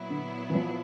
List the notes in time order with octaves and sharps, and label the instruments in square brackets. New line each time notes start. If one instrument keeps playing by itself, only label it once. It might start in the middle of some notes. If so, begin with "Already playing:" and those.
Already playing: [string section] A#2 F#3 B3 E4
[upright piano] D3
E3
F3